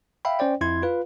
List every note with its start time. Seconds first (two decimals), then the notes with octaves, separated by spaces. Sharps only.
0.25 E5 F5 G5 B5
0.39 C#4 C5 D5 G5
0.61 F2 E4 C6 G#6
0.83 F4 B4 F5